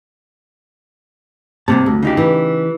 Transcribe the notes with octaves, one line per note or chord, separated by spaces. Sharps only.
G2 C3 A#3 A5
D2
C#3 D#4 G4
E3